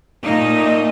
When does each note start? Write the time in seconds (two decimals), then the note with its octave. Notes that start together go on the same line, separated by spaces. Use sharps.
0.23 A#2 A3 A#3 D#4 D#5